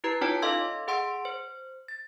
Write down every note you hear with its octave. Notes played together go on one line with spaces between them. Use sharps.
E4 G4 B4 A#5 G#6
C#4 D#4 F4 C#5 G5 A5
A4 D#5 F5 C6 E6 G#6
G#4 F#5 C6 E6 D7
C5
A6